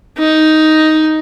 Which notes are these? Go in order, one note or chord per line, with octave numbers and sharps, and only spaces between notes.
D#4